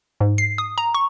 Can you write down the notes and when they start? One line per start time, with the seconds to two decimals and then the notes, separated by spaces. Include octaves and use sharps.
0.21 G#2
0.38 C7
0.58 D#6
0.78 A#5
0.95 C#6